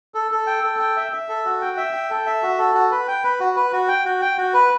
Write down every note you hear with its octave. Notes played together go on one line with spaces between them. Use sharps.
A4
A4
G5
A4
G5
E5
E5
A4
F#4
G5
E5
G5
A4
E5
F#4
A4
F#4
B4
G5
B4
F#4
B4
F#4
G5
F#4
G5
F#4
B4